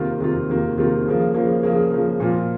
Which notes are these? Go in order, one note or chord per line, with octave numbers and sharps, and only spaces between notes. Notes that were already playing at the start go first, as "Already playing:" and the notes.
Already playing: C3 D#3 A#3 F4
C3 D#3 A#3 F4
C3 D#3 A#3 F4
C3 D#3 A#3 F4
C#3 F3 A#3
C#3 F3 A#3
C#3 F3 A#3
C#3 F3 A#3
A#2 F3 A#3 F4